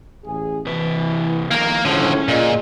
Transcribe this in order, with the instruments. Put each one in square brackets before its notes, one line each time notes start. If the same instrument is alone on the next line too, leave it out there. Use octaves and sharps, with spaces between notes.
[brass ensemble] A1 G#4
[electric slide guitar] C3 B4 [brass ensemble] E3
[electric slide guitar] F2 D#3 [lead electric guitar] A#3 A#4
[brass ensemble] A#1 A2 [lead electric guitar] D3 F3 [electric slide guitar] C#4
[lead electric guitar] A#2 [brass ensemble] F4 G#4 D#5